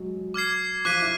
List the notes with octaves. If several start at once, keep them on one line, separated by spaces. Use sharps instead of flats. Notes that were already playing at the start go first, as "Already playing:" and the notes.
Already playing: F#3 G#3 F#4
D6 F6 G#6 C7
F3 F4 D6 F#6 B6 D#7
E4